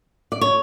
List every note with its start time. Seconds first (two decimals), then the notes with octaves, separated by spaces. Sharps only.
0.32 D5
0.41 C#5